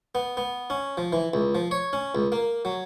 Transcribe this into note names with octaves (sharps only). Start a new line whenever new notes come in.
B3
B3
C#4
F3
E3
C#2
F3
C#5
C#4
C#2
A#3
F#3